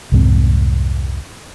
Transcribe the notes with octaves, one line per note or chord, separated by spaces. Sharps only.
C2 F2 G#2 C4